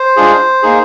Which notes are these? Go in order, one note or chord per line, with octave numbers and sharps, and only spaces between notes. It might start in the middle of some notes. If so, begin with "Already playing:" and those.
Already playing: C5
G#3 D4 F4 G#4
A#3 D#4 G#4